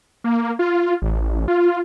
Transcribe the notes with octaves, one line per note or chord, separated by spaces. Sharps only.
A#3
F4
A1
F4